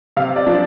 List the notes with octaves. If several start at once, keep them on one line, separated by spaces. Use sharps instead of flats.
C3 F5
D5
F3 D4